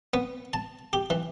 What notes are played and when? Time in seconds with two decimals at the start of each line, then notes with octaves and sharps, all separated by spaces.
0.14 B3
0.53 A5
0.93 G4
1.10 E3